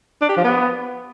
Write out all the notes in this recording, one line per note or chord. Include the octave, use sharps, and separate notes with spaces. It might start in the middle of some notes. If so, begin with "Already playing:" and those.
D4
G4
F3
B3